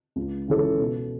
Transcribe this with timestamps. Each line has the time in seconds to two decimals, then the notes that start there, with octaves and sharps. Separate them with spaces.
0.16 C#2
0.48 C#3 E3 C#4 A4
0.79 B2